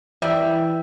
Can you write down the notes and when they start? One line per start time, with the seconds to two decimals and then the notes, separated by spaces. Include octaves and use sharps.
0.22 E3 G3 E5